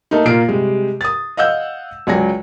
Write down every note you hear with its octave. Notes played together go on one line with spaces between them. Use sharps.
A3 A#3 D#4
A#2 A#3 F4 C7 D7
C3 G3 G#3
D#6 A6
D#5 F5 F#5 E6 G6
C#2 F#3 D5 G#5 A#6